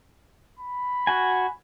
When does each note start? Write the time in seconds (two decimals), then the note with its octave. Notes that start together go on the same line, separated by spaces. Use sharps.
0.59 B5
1.07 F#4 G#5